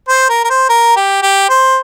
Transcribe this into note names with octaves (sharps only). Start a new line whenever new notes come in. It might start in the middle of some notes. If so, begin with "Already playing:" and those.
C5
A#4
A#4
C5
A#4
G4
G4
C5